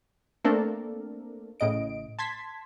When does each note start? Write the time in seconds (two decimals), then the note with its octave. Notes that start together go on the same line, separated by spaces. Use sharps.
0.44 A3 A#3 C4 D4 A4 A#4
1.60 A1 A2 C#3 D#5 D7
2.19 A5 C6 G#6 B6